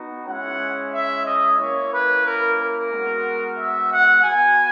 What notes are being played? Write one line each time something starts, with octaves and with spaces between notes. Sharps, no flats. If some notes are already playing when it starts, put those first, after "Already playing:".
Already playing: B3 D#4 F#4
G#3 C#4 E4 F#5
E5
D#5
A#3 C#4 E4 C#5
B4
A#4
A#4
G#3 B3 F#4
E5
F#5
B3 F#4 G#5